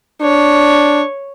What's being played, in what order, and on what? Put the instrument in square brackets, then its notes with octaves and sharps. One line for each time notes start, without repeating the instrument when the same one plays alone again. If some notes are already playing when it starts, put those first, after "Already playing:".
[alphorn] D4 [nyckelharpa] C#5